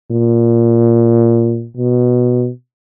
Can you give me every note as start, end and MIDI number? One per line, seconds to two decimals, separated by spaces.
0.11 1.68 46
1.76 2.50 47